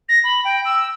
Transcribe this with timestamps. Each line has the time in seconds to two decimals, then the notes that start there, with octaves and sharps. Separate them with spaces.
0.09 A#6
0.24 B5
0.44 G5
0.65 E6